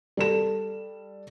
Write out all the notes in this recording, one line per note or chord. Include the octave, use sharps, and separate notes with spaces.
G3 A4 E7